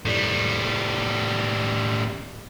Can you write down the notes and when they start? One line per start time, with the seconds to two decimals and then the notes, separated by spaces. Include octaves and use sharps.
0.05 A2 G3